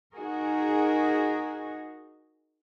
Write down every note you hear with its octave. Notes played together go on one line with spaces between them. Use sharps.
D#4 F#4 G#4 A#4